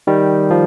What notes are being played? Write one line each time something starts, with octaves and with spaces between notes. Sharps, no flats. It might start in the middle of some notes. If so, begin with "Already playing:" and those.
D#3 G3
F3